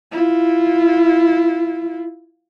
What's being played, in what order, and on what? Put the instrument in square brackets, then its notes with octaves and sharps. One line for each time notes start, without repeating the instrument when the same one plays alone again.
[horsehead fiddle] E4 F4